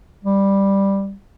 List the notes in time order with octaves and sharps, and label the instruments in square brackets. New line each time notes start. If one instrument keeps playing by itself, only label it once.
[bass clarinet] G3